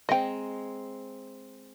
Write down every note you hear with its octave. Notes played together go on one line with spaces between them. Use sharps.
G#3 C4 D#5 G5 A#5